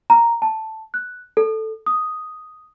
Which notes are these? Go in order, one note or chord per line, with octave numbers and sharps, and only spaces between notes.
A#5
A5
F#6
A4
D#6